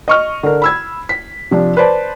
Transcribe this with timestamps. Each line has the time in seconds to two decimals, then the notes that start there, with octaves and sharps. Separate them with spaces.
0.08 D#5 C#6 F6
0.43 D3 A#4
0.62 B5 E6 G#6
1.09 B6
1.51 C3 F3 D4
1.77 B4 C5 D5 A5